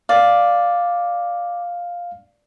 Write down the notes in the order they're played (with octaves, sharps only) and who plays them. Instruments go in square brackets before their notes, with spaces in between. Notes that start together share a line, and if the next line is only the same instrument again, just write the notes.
[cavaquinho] D5 [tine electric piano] F5